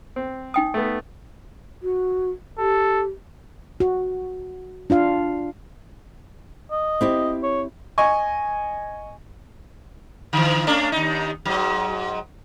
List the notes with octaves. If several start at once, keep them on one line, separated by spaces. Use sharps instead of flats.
C4
D#4 G5 D#6
A3 B3
F#4
G4 A4
F#4
D4 F4 F5
D#5
C4 E4 G4
C#5
D#5 G#5 C#6
D3 E3
A3 C#4 D4
D#2 D#4
G#2 F#3